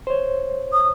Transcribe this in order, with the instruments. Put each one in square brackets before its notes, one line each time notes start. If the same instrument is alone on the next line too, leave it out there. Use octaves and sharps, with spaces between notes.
[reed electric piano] C5 C#5
[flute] D#6